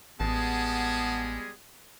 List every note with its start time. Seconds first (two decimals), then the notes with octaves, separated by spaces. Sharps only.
0.20 A1 G3 G#3 B3 G#4 A5